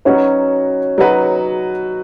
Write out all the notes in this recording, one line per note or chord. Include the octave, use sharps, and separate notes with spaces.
F#3 C#4 D#4 F#4 B4
F#3 D#4 F#4 B4